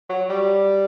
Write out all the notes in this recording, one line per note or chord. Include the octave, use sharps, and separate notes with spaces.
F#3
G3